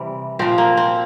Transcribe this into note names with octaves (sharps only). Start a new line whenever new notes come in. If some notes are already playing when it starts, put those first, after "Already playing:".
Already playing: C3 E3 G3
A#2 F3 C4
A#3
C4